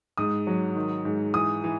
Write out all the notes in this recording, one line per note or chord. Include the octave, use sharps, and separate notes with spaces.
G#2 D#6
F#3
D#3
G#2
E3 D#6
E3